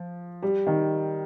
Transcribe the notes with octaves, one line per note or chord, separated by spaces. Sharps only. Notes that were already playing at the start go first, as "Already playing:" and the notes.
Already playing: F3
G3
D#3